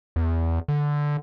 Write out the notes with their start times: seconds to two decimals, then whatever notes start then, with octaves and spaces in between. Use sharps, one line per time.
0.16 E2
0.68 D3